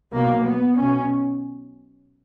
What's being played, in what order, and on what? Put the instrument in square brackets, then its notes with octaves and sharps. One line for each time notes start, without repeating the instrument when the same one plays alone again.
[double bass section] B1 B2 A#3
B3
B1 B2 C#4